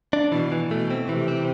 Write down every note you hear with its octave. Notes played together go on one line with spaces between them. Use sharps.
D4
B2 E3
E3
B2 A3
C4
C3 E3
C4